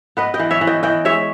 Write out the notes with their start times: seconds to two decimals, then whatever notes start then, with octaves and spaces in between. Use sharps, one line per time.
0.17 B3 B4 D#5
0.34 D#5 G5
0.39 E3
0.51 C#5 E5
0.61 E3
0.67 D#5 G5
0.83 E3 D#5 G5
1.05 G#3 C#5 E5